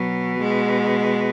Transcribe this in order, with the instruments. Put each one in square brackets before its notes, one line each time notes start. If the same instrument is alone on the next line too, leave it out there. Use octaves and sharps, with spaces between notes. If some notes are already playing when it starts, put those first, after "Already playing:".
Already playing: [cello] B2 [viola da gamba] F#3
[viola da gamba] G#3